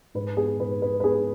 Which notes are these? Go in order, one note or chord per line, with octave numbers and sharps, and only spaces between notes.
G#2 B4
B3 G#4
G#2 B4
G#3 B4
B4
B3 G#4